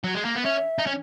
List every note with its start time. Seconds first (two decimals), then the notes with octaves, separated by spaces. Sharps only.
0.04 F#3
0.15 G#3
0.25 A#3
0.35 B3
0.44 C#4 E5
0.78 D#4
0.86 C#4